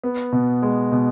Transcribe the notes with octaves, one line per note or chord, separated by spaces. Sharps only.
B3
B2
G#3
B2